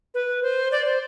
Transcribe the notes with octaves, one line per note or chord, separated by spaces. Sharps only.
B4
C5
D5
C5